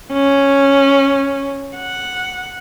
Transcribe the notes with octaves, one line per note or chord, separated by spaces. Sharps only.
C#4
F#5